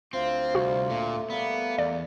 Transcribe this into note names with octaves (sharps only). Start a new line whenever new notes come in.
D2 C4 F4 C5
C2 F#4
A#2 A3
G3 A#3 B3
E2 D5